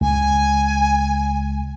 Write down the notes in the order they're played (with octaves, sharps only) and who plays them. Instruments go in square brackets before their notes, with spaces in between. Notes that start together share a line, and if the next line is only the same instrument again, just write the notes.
[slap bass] C#2 [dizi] G#5